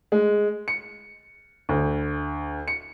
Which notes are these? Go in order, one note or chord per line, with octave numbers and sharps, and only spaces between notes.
G#3
C#7
D2
C#7